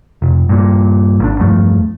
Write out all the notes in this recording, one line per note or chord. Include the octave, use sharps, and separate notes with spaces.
F1
G2 A#2
G#1 D4
E2 G2 F3 A3